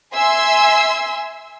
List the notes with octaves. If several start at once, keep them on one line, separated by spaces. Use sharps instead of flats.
E5 G#5 C6 E6